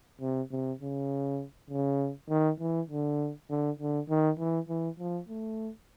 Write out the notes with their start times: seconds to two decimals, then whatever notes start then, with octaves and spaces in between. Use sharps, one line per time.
0.21 C3
0.52 C3
0.81 C#3
1.70 C#3
2.30 D#3
2.60 E3
2.90 D3
3.50 D3
3.79 D3
4.09 D#3
4.39 E3
4.69 E3
4.99 F3
5.29 A3